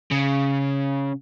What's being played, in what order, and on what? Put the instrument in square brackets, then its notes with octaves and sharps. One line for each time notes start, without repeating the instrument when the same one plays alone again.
[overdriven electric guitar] C#3